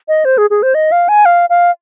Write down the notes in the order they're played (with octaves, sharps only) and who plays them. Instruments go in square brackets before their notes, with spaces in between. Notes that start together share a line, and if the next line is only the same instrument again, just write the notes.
[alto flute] D#5
C5
G#4
G#4
C5
D#5
F5
G#5
F5
F5